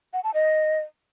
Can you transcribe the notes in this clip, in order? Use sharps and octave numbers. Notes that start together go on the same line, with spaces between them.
F#5
A5
D#5